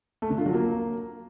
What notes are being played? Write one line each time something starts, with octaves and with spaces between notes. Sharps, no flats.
A3
D3
F4
F#3
A#3